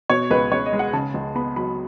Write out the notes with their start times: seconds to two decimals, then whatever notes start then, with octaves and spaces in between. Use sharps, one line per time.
0.10 B2 C#5
0.30 C#2 B4
0.52 C#2 C#5
0.66 D#5
0.73 G#3
0.79 F#5
0.93 C#3 A5
1.14 C#2
1.35 B3 B5
1.56 F#3 B5